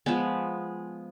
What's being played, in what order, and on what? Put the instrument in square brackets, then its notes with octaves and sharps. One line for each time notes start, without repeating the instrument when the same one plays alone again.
[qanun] F3 G#3 B3